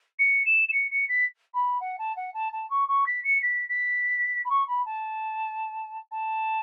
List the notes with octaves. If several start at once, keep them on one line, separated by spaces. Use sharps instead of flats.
C#7
E7
E7
C#7
C#7
B6
B5
F#5
A5
F#5
A5
A5
C#6
C#6
B6
C#7
B6
B6
B5
C#6
B5
A5
A5